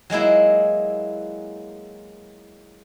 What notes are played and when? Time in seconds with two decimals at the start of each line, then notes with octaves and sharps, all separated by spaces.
0.10 F#3 G#3 A#3 E4